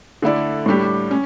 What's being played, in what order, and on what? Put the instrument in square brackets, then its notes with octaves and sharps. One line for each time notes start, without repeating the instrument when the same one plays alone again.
[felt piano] D3 A3 E4 A4 D5
A2 G3 D4 G4
C#4